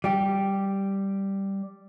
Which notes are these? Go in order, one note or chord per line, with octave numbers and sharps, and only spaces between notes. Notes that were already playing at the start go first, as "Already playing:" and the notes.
G3 G4